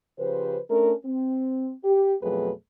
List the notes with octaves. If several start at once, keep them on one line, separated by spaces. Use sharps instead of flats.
C#3 F3 G4 B4 C5
A3 C#4 D4 A#4
C4
G4
F2 B2 F#3 A3 G#4 B4